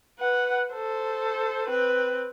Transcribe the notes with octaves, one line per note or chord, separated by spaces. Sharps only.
B4 F#5
A4 C5
C4 B4